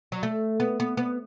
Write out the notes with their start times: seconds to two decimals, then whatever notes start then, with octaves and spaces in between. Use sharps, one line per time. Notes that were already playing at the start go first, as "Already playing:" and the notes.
0.12 F#3
0.23 A3
0.60 B3
0.80 B3
0.97 B3